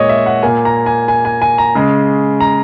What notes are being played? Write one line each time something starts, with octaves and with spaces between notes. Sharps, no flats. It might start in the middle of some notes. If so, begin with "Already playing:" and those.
Already playing: A#2 G#3 C#5 D#5
E5
F#5
A#2 A#3 G#5
A#5
G#5
G#5
G#5
G#5
A#5
C#3 G#3
A#5